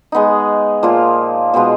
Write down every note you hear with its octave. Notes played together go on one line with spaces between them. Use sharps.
G#3 B3 D#4
A#2 F3 A#3 F4
B2 G#3 B3 F4